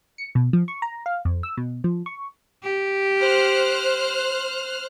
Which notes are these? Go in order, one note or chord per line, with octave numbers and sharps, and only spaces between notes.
C#7
B2
F3
C#6
A#5
F5
F2
E6
B2
F3
C#6
G4
C5 F6 F#6